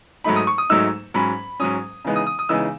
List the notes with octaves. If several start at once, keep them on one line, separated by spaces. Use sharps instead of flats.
G#2 F#3 A3 D#4 B5
D#6
C#6
D#6
G#2 F#3 A3 D#4 E6
G#2 F#3 C#4 B5
G#2 F#3 C#4 D#6
C#3 E3 G#3 B3 D#4
D#6
D#6
D#6
C#3 E3 G#3 B3 D#4 E6